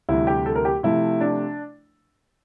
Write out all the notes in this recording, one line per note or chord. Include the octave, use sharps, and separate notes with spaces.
D2 C3 E3 G3 E4
G4
A4
A#4
G4
C3 F3 A3 E4
D4